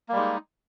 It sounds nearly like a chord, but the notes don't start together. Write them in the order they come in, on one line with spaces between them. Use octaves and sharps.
A#3 G3 G#3 D#4